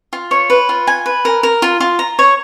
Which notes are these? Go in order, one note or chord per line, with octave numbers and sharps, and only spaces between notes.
F4
C#5
B4
F4
G#5
B4
A#4
A#4
F4
F4
A#5
C#5